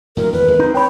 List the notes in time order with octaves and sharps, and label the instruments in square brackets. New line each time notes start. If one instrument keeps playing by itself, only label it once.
[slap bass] A2 D3 F#3 [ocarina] A#4
[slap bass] G#1 E2 [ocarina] B4
[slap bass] D#2 G#3
[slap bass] C4 D4 [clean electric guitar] D#4
[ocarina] C#5 [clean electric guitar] G5 B5